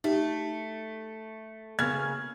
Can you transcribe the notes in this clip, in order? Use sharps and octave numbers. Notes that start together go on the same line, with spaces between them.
A3 D#4 G4
C#3 A#3 B3 F6 G#6